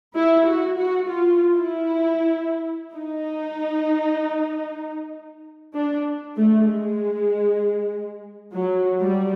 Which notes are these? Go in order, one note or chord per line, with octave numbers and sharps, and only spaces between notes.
E4
F#4
F#4
F4
E4
D#4
D4
A3
G#3
F#3
G3